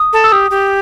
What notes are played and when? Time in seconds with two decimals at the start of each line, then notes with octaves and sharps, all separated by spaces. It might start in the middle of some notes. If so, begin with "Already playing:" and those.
Already playing: D#6
0.13 A4
0.24 E6
0.32 G4 D#6
0.51 G4